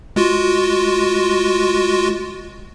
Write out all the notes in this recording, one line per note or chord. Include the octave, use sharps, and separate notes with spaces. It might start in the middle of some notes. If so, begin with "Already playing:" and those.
G#3 F4 F#4